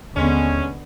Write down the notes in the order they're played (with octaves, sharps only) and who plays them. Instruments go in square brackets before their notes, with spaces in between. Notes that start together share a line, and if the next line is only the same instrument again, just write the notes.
[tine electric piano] D#2 [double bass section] D3 B3 [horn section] G#3 C#4